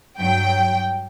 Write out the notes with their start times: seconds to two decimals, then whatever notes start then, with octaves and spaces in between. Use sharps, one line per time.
0.19 G2 F#3 G5